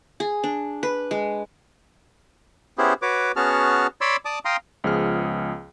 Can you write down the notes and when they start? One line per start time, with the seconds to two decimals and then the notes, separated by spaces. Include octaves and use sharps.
0.20 G#4
0.44 D4
0.83 B4
1.11 G#3
2.78 B3 C#4 E4 G4 G#4 C5
3.02 F#4 B4 C#5 D6
3.36 B3 C#4 F#4 G#4 A5 F6
4.01 C#5 D5 B5 C6 D6 E6
4.25 D5 A5 D6 D#6
4.45 F5 G5 A#5 C6 D#6
4.84 C#2 F3 B3 G#4 F6